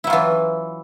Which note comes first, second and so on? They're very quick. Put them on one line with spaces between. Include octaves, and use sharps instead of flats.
E4 F#3 F4 E3